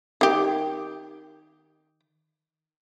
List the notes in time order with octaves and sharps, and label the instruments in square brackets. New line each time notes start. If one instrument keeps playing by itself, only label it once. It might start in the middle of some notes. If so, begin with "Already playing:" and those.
[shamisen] D#3 G4